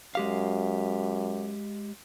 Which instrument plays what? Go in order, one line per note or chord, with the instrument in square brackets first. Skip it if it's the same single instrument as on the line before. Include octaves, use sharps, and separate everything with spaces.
[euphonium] F#2 [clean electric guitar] G#3 G4 F5